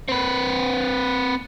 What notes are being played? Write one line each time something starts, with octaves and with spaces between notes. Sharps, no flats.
C4 B4